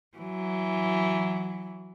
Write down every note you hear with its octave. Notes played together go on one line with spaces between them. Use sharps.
E3 F#3